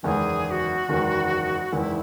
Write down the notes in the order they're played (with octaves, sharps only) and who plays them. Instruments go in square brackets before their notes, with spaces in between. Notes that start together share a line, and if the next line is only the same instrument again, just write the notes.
[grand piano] F#1 E2 D#3 G#3 [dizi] G#4 A#4
[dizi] G#4
F#4
[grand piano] F#1 E2 D#3 G#3
[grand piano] F#1 E2 D#3 G#3 [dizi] E4